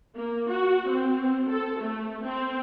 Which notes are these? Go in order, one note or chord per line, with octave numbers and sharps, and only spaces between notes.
A#3
F#4
C4
A4
A3
C4